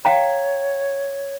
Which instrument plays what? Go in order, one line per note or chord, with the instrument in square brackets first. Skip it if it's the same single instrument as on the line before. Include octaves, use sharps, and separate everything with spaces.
[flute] C#5 [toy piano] F5 G5 A#5